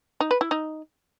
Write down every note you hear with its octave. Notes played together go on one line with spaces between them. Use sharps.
D#4
B4
E4
D#4